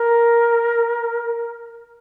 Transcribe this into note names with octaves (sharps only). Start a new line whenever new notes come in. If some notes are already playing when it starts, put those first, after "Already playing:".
Already playing: A#4